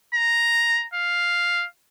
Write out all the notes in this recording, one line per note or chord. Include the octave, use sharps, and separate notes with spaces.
A#5
F5